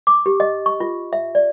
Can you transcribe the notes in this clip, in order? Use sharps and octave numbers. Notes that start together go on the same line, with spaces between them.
D6
G4
D#5
C#6
F4
E5
D5